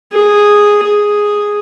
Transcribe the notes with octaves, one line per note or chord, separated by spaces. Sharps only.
G#4
G#4